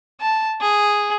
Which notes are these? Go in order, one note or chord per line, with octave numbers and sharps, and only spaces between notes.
A5
G#4